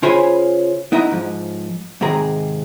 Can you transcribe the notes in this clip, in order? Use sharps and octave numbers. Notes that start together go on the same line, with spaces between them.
C#3 F4 C5 C#5 G#5 B5
B3 D#4 E4 D#5 F#5 A#5
G#2 F3
G#2 C3 D#3 G#4 A#5